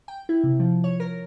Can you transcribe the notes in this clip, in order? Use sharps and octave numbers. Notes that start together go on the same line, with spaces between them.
G5
E4
C3
F3
C#5
A#4